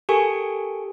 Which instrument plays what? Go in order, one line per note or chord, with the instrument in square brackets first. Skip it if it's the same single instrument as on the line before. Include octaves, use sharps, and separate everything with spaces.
[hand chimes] G4 A4 A#4 G#5 C#6